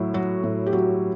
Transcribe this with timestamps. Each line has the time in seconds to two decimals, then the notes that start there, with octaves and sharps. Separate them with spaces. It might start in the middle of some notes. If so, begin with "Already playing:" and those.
Already playing: A2 F#3 E4
0.14 F#3 F#4
0.44 A2
0.66 G4
0.73 F#3 F#4